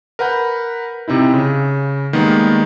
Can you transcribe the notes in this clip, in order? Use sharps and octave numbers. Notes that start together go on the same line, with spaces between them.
A#4 B4 F#5 B5 G6
C3 C4 D#4 E4
C#3
D#3 G3 G#3 A#3 B3